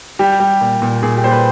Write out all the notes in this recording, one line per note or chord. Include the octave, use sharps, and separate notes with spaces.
G3 G4
G3
A#2
A#2
A#2 G#4
G4
G3 C5
B4